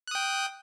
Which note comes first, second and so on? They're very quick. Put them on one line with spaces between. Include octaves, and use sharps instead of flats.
F#6 D#6 G5